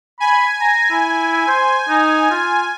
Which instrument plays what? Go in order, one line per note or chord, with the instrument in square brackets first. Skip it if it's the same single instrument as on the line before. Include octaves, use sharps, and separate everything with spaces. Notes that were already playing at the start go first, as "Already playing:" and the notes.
[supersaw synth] G#5 [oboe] B5
[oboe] A#5
E4
C5
D#4
F4